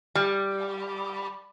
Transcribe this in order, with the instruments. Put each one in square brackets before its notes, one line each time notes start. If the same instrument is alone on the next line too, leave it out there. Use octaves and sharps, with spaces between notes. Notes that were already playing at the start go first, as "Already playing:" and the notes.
[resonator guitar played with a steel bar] G3